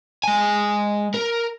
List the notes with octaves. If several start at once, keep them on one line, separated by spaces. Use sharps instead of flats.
G#3 G#5
A#4